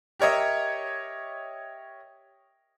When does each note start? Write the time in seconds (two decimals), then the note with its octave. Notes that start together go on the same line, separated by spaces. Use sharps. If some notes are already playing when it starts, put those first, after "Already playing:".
0.19 G4 A#4 C#5 D#5 E5